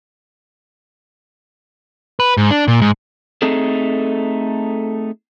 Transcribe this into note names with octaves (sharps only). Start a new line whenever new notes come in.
B4
G#2
D4
A#2
G#2
A3 C4 D#4 G#4 A4